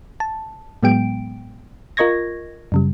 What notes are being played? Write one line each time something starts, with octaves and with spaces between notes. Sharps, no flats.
A5
A2 F#3 G#3 B3 G5 D7
F4 A#4 D#5 C#6 G#6 A#6
F#2 C#3 G3